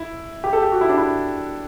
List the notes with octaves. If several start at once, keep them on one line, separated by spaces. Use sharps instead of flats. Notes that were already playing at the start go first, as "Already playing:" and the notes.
Already playing: E4
G4
A4
G4
F#4
E4
D4
E4